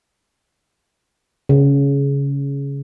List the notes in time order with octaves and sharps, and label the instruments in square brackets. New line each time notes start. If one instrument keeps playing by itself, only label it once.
[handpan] C#3